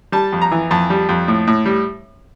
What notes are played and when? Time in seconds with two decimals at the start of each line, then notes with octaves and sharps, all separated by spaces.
0.12 G3 A5
0.33 F2
0.41 A#5
0.51 E3
0.71 F2 A5
0.90 G3
1.09 F2
1.28 A2
1.47 A2
1.66 G3